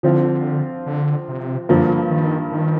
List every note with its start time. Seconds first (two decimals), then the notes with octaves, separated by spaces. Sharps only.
0.03 D3 F3 C4 F4
0.86 D3
1.28 C3
1.69 G2 D3 F3 A#3
2.11 D#3
2.52 D#3